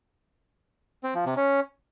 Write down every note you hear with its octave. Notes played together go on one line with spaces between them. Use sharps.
C4
F3
C3
C#4